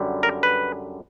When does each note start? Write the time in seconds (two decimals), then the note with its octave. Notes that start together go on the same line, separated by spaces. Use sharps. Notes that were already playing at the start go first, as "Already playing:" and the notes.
Already playing: F#2 D3 G3
0.23 A#4
0.43 B4